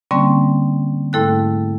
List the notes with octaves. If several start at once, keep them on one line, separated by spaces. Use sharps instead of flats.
D3 G3 A#3 C4 C#4 C#6
G#2 A3 E4 A4 G5 F#6